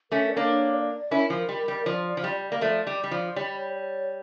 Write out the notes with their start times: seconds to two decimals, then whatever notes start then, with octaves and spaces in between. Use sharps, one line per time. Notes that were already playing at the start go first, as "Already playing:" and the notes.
0.11 A3 C#4 A#4
0.30 D5
0.36 A#3 D4 C#5
0.74 D5
1.11 C#4 E4 A#4
1.30 F3
1.49 G3
1.68 G3
1.86 F3 D5
2.17 F3
2.24 G3
2.52 A#3
2.61 F3 A3 D5
2.87 G3
3.04 G3
3.11 F3
3.36 G3 C#5
3.74 C#5